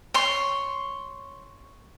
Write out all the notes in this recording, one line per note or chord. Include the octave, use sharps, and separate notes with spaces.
C#5 C6